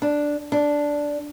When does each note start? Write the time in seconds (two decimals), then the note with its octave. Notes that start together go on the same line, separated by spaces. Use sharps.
0.02 D4
0.52 D4